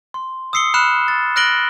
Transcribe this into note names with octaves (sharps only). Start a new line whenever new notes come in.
C6
D#6 E6 C7 C#7 G7
B5 F6 F#6 C#7 E7
A6
F6 F#6 A#6 D7 F#7 G7